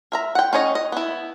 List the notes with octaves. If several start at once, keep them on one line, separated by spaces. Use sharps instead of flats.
A#4 E5 A#5
F#5 G5
C#4 D#4 C#5 D#5
D#5
B3 E4